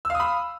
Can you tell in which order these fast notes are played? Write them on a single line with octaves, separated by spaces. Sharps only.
E6 F5 D#6 B5